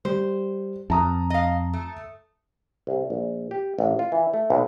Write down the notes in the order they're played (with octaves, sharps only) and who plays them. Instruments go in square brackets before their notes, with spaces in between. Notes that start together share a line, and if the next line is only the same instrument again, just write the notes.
[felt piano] G3 [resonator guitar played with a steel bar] C5
[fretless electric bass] F2 [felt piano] A5 A#5 D#6
[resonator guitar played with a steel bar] D#5 F5
A3
[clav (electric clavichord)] C2
A#1
G4
A1
F4
E3
A3
B1